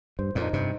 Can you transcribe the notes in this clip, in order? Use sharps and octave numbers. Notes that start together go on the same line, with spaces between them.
G2 C5
F2 A#2
D#4
G2 C3